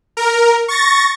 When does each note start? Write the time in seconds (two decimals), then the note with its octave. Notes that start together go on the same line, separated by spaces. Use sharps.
0.17 A#4
0.68 C#6 A6 A#6